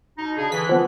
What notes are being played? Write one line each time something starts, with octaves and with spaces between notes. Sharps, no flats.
B2 D#4
C#3 D4 G#4
D3 E3 B6
F3 B3